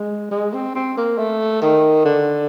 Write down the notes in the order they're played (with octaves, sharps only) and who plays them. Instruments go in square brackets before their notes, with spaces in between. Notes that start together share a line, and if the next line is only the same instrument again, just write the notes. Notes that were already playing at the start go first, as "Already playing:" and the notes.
Already playing: [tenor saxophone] G#3
G#3
C4
C4
A#3
A3
D#3
D3